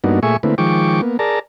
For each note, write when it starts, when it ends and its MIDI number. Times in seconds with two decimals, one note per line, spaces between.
0.04 0.20 43
0.04 0.20 58
0.04 0.20 59
0.04 0.20 62
0.04 0.20 63
0.04 0.20 66
0.23 0.37 46
0.23 0.37 57
0.23 0.37 68
0.23 0.37 76
0.23 0.37 80
0.23 0.37 85
0.43 0.55 50
0.43 0.55 57
0.43 0.55 58
0.43 0.55 60
0.43 0.55 64
0.43 0.55 71
0.58 1.01 51
0.58 1.01 53
0.58 1.01 56
0.58 1.01 79
0.58 1.01 85
0.58 1.01 86
1.02 1.17 58
1.02 1.17 59
1.19 1.39 68
1.19 1.39 70
1.19 1.39 74
1.19 1.39 81
1.19 1.39 82